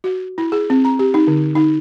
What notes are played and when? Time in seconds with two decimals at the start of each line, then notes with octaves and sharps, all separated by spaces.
0.04 F#4
0.38 E4
0.52 G#4
0.70 C4
0.85 A#5
0.99 G4
1.14 D#4
1.27 D3
1.55 D#4